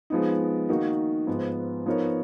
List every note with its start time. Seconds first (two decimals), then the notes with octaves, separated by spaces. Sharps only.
0.10 F3 G#3 B3 D#4
0.69 D#3 A#3 D#4 F#4
1.27 G#2 F3 B3
1.86 F3 B3 D#4 A#4 C#5